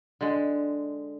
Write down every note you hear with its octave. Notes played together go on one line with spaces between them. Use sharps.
D3 G#3